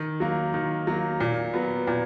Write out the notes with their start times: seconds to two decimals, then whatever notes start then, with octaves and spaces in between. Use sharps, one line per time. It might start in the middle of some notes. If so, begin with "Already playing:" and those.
Already playing: D#3
0.20 F#3 A#3
0.54 D#3
0.87 F#3 A#3
1.20 A#2
1.53 F#3 B3
1.87 A#2